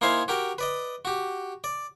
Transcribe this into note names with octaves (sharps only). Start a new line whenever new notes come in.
A#3 D#4 E4 C5 F5 G#5
F#4 G4 A#4 G5
B4 D5 D#5
F#4 G4
D5